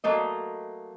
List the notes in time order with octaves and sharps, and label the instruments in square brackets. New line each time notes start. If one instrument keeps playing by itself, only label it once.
[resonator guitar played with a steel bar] F#3 A3 A#3 D#5